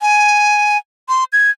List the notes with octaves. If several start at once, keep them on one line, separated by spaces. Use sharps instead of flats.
G#5
C6
G#6